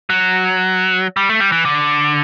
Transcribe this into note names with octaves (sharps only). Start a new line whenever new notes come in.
F#3
G3
A3
G3
E3
D3